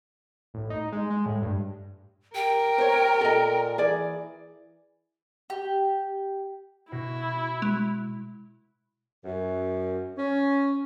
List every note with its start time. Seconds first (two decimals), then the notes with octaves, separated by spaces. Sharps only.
0.54 A1
0.70 D#4
0.92 G#3
1.10 G#3
1.26 A2
1.42 G2
2.35 G4 A#4 G5
2.78 C5 C#5
3.21 A#2 A4 D#5
3.78 E3 G#4 D5
5.50 G4
6.92 B2 E4 F#4 A#6
7.62 G#3
9.23 F#2
10.16 C#4